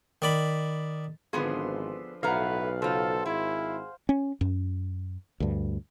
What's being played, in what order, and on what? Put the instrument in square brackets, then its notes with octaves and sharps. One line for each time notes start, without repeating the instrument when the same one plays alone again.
[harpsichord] D#3 D5 B5
[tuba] G#1 [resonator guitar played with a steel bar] D3 B3 G#4 [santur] F3 B4 C6
[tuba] B1 [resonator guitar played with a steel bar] A2 A3 A#5 [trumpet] B4 [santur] F5 F#5
[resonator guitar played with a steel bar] C#3 F4 [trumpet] A4 [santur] C5
[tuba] G#1 [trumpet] E4 [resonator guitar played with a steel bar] G#4
[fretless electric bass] C#4
F#2
D2 G2